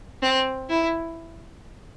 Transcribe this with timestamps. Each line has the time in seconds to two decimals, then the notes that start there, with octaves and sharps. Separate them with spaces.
0.22 C4
0.70 E4